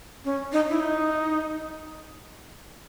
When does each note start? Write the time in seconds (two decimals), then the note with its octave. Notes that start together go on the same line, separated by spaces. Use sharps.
0.24 C#4
0.52 D#4
0.70 E4
0.80 D#4